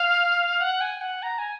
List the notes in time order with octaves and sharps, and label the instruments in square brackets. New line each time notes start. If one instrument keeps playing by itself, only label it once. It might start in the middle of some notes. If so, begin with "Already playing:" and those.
Already playing: [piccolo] F5
F#5
G#5
F#5
A#5
G#5